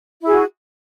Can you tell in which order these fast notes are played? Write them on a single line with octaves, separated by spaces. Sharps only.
E4 G#4 F#4